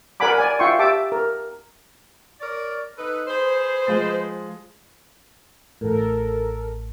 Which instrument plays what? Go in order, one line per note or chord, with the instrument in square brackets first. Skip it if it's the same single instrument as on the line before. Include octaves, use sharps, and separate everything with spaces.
[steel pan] A#4 D5 F#5 G#5 B5 D6
D5 G#5
F4 E5 F#5 G5 C6 C#6
G4 E5 A5 D6
A#4
[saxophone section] A#4 C#5 D5
D#4 A4 B4
G#4 B4 C5
[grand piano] F3 G#3 A6
[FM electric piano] A1 A2 [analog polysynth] A4 A#4